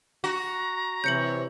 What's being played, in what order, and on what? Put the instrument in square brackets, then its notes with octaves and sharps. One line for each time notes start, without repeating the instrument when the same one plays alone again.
[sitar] F#4 [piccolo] A#5
[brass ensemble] C3 E3 C#5 [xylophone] G6 C#7 F#7